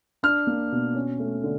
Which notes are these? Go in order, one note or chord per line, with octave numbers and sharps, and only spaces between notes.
D4 F6
A#3
B2
C#4
A3
D3